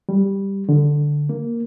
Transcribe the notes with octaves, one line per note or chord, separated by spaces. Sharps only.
G3
D3
A#3